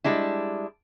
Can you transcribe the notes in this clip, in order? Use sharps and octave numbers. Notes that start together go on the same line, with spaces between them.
G3 G#3 D4 E4